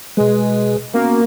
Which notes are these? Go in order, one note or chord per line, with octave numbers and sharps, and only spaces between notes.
B2 G#3 B4
A#3 B3 C#4 F#4